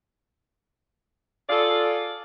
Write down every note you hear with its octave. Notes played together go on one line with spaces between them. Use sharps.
F4 G#4 A4 D5 F5